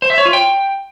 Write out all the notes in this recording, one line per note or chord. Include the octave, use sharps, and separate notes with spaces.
C5
E5
C#5
F4
G5